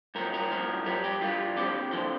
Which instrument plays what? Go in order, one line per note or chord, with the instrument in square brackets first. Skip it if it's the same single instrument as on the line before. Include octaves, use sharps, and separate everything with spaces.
[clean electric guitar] G2 F3 A#4
A#4
G2 F3
G2 G3 A#4
G4
G2 G3 F4
F2 D3 F3 G4
F2 D3 F3 C5